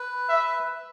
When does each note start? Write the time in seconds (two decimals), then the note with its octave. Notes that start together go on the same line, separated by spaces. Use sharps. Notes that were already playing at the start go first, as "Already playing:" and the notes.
Already playing: B4
0.29 E5